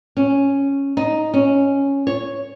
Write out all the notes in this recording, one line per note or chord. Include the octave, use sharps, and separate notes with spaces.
C#4
D#4
C#4
C#5